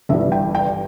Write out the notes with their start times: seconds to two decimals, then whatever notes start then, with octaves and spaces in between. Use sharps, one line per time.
0.09 G1 G2 E3 G3 E5
0.32 G5
0.55 G5